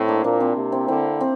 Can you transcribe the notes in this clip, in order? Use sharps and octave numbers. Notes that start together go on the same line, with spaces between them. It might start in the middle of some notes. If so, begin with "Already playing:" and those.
Already playing: A2 C4 E4
A#3 D4
A#2 A#3 D4
C4 E4
C3
C4 E4
D3 C4 E4
C4